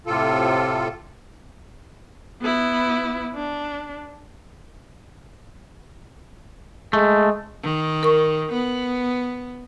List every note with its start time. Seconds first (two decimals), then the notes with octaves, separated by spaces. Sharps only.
0.06 A2 C3 F4 A4
2.42 B3 E4
3.35 D4
6.93 G#3 A3
7.63 D#3
8.03 A#4 C#6
8.52 B3